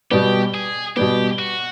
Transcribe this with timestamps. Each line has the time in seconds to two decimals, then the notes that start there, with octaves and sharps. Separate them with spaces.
0.11 B2 G3 B3 G4
0.54 G#4
0.96 B2 G3 B3 G4
1.39 F#4